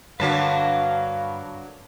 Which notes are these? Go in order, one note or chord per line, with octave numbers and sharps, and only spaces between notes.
G2 D3 F#3 A#3 F#4 B4 F5 A5